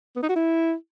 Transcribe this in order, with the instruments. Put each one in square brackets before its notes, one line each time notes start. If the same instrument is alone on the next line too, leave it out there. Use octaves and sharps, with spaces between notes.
[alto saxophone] B3
D#4
F#4
E4